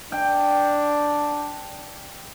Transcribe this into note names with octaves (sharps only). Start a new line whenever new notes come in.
D4 G5